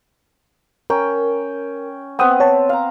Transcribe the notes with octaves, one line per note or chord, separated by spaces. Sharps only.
C#4 A#4 G5
B3 C4 B4 G5 D#6
C#5 A5
F5 A#5